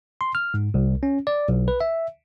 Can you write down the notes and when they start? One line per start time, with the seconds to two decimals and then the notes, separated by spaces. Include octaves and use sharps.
0.21 C6
0.35 F6
0.54 G#2
0.74 C2
1.03 C#4
1.27 D5
1.49 B1
1.68 B4
1.81 E5